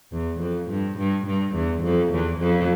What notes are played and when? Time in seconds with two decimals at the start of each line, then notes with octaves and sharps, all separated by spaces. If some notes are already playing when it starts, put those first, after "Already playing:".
0.12 E2
0.40 F2
0.69 G2
0.98 G2
1.27 G2
1.55 E2
1.83 F2
2.12 E2
2.40 F2